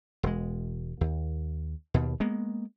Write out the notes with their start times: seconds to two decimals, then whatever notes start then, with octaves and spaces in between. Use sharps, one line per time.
0.23 E1 G#3
1.01 D#2
1.94 D#2 B2
2.20 G#3 A#3 B3